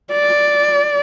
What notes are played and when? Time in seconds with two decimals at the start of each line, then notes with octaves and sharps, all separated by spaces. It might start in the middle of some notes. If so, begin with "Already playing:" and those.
0.12 D5